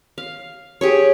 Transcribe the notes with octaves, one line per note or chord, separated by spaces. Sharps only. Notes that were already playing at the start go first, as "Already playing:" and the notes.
F5
G4 G#4 C#5